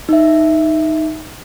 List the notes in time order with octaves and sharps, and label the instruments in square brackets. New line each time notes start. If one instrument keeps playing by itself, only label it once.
[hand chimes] D#4 E5